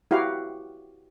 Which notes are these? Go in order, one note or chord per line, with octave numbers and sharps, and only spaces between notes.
E4 F#4 G4 F5